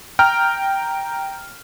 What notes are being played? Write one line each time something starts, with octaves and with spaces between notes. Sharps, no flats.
G5 A#5 F6